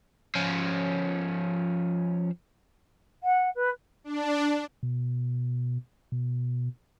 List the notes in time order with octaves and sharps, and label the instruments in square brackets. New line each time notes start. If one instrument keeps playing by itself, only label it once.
[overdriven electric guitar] F3 C#4
[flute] F#5
B4
[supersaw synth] D4
[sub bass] B2
B2